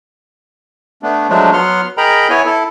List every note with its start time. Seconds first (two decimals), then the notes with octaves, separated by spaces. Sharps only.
1.03 A3 B3 D4
1.29 F3 F#3 G#3 A3 D4
1.53 F#3 B3 F#5 C6 F6
1.98 G#4 A#4 D#5 G5 A#5 B5
2.30 B3 E4 C#5 G#5
2.45 E4 A4